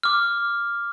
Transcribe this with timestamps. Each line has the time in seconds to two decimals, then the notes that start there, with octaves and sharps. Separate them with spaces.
0.03 D6 F6